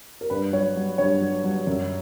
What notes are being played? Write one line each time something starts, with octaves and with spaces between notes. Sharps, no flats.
A#4
G2 B4
F#3 C#5
F#3
G2 C#5
F#3
F#3
F#2